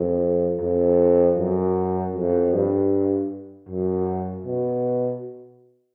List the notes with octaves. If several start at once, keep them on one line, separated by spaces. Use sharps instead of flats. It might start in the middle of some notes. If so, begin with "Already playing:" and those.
Already playing: F2
F2
F#2
F2
G2
F#2
B2